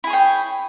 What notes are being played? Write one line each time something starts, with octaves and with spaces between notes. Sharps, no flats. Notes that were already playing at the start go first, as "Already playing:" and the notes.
E4 G#4 C#5 G5